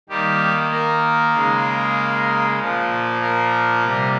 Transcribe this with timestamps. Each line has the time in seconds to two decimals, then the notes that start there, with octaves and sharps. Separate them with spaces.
0.09 D#3 G3 A#3 G4
0.71 A#3 A#4
1.34 C#3 G#3
2.59 A#2 F3 A#3
3.22 A#3 A#4
3.84 C3 G3 A#3